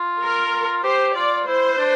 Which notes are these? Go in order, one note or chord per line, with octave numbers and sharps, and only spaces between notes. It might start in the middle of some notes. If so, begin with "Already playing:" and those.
Already playing: F4
A#4
G4 C5
F4 D5
E4 C5
D4